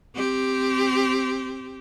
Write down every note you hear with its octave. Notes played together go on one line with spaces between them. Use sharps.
C4 G4